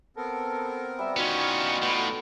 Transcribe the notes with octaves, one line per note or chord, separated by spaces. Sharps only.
B3 C4 A4 A#4
G3 E5
E3 B3 C#4 D#4 F4 F#4
A2 B3 A4